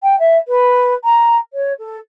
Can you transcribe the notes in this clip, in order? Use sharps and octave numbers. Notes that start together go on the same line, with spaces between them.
G5
E5
B4
A#5
C#5
A4